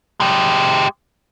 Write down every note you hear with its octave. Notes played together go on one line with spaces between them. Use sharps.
G#3 G4